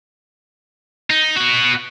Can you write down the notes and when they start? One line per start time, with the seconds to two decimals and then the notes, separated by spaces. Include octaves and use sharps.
1.10 D#4
1.36 B3 F#4